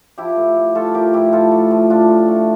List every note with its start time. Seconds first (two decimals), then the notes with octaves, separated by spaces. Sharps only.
0.18 F3 E4 G4
0.37 A2
0.56 A2
0.75 A3 F4 A4
0.94 F3 G4 A#4
1.13 A2 E4 G4
1.32 A2 F4 A4
1.51 A3
1.71 F3
1.90 A2 D4 F4
2.09 A2
2.28 A3